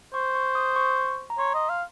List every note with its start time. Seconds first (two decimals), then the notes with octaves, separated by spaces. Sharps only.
0.14 C5 C#6
0.35 C#6
0.55 D#6
0.76 C#6
1.30 A#5
1.38 C#5 C6
1.54 D#5
1.69 F5